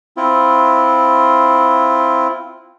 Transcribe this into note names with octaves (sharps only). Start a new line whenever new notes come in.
C4 E4 F4